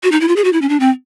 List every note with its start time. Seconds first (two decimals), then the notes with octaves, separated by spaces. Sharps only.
0.03 F#4
0.12 D#4
0.21 E4
0.28 F4
0.36 G#4
0.44 F#4
0.53 E4
0.62 C#4
0.69 D4
0.80 C4